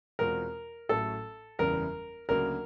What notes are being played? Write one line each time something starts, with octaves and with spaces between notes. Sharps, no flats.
E2 B2 G#3 C4 F4 A#4
A1 A2 F#3 A3 A4
F#1 E2 C#3 E3 G3 A#4
D2 C#3 F#3 A#3 D4 A#4